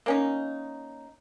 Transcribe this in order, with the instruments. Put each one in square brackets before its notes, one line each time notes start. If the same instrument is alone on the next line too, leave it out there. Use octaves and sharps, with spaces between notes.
[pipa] A#3 C#4 D#4